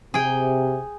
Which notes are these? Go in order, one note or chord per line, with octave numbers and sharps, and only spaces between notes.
C3 G#4 G5